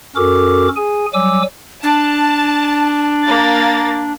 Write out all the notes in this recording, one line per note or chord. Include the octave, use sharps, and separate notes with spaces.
F#2 C#4 F#4 A4 A#4 D6
G#4 G#5
F#3 G3 G#5 D6 E6
D4 A5
A#3 A6